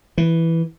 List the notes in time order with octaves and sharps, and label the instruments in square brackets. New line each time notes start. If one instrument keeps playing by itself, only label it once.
[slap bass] E3